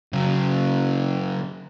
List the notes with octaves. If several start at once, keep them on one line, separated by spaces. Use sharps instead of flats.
C#3 F#3